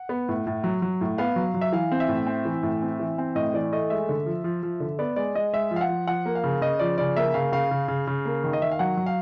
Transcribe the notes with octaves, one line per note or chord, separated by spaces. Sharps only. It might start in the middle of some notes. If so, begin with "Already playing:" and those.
Already playing: F#5
B3
A2
A2
F#3
F#3
A2
B3 F5
F#3
F#3
E5
E3 F5
C4
E5
A2
C4
E3
A2
C4
E3
C4
A2 D#5
E3 D5
A3 D#5
G#3 E5
D3
F3
F3
F3
D3
B3 D5
G#3 D5
G#3 D#5
G#3 E5
F3
F5
F#5
F3
F3 F#5
A#3
F5
C#3
C#3 D#5
F3 D5
C#3 D5
A#3 E5
C#3 F5
C#3 F5
C#3
C#3
C#3
A#3
D#3
D#5
D#3 E5
F5
F#3 F#5
F#3
F5